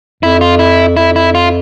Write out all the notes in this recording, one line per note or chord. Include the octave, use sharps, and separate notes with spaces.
F2 E4
F4
E4
F2 E4
E4
F4